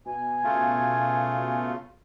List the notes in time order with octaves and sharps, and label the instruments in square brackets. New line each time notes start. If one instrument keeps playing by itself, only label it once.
[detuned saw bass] B2 [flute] G#5
[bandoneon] C#3 A3 F4